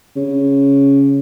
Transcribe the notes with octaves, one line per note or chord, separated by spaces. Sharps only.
C#3